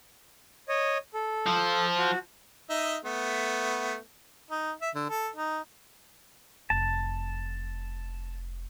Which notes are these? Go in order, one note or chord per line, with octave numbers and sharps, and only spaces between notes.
C#5 D#5
A4
F3
F#4
D#4 D#5 E5
A3 B3
D#4
E5
D3
A4
D#4
F1 A5